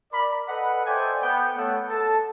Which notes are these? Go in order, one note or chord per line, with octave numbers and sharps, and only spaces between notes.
A#4 D5 B5
A4 B4 D#5 F#5
A4 C5 D5 E5 G5 G#5
B3 G5
A3 B3 A4 C#5 F#5
A4 A5